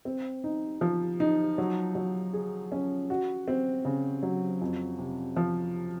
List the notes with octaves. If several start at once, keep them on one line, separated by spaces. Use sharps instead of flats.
C4
D#4
F3
D#4
F#3
F#3
G#4
C#4
F#4
C4
C#3
F#3
F2
C3
F3